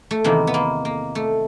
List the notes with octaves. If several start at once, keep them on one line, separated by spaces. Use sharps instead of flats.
A3
E2 C3 D#3 A#3
B3
A#3
A#3
A3